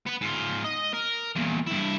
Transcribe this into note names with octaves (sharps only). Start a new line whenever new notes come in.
B3 B4
G#2 F4
D#5
A#4
E2 A#2
G2 E4